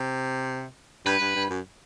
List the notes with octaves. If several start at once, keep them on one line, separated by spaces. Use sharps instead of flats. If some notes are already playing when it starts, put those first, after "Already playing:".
Already playing: C3
G2 B4
G2
G2
F#2